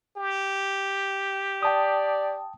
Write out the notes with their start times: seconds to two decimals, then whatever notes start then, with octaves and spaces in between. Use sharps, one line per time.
0.16 G4
1.63 D5 G5 A5 D#6